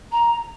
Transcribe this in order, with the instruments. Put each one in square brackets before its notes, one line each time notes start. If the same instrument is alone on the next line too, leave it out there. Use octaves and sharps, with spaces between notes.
[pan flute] A#5